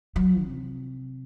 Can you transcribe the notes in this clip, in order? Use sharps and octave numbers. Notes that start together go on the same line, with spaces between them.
F#3
C3